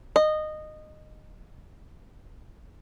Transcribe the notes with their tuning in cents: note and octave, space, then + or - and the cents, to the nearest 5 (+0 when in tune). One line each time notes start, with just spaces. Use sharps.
D#5 -15